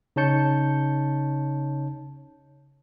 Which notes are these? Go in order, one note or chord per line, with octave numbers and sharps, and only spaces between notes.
C#3 D#4 C#5 A5 G6 C#7